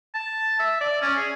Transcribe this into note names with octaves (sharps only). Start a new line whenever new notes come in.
A5
E5
D5
C#4
G#4